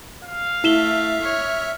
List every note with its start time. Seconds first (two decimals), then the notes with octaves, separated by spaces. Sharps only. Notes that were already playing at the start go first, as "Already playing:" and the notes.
0.24 F5
0.64 A3 E4 E5 E7 G7
1.22 C#5 F6